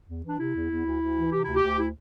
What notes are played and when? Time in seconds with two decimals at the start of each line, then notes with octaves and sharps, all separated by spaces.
0.08 E2
0.23 E3
0.29 D4
0.38 C3 E4
0.54 E2
0.69 E2
0.85 D2
1.01 D2
1.15 E3
1.32 C3 G4
1.44 D2 E4
1.55 G4
1.63 D2
1.78 E4